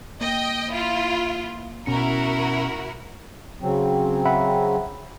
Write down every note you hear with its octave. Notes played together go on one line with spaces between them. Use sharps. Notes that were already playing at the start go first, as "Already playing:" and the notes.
A#3 D#5 G5
E4 F4
B2 C#4 E4 F#4 A#4 C#7
C#3 F#3 C4
E5 F#5 B5